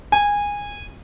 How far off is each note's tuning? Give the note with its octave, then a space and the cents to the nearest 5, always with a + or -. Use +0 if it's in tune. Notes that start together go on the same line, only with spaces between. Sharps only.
G#5 -20